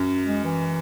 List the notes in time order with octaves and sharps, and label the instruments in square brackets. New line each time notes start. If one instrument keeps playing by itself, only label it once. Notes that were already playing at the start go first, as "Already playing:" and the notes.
Already playing: [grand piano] F#2
[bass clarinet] G#3
E3